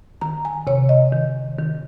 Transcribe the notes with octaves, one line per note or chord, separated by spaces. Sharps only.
D#3 A#5
G#5
C3 C#5
D#5
D#3
D#3